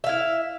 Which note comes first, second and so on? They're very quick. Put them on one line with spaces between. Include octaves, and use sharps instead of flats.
E5 F5 E4